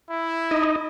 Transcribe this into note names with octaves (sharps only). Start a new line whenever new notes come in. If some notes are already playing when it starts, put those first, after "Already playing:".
E4
D#4 D#5